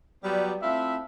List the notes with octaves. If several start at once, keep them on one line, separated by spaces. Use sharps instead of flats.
F#3 G3 B3
A3 C4 E4 F4 E5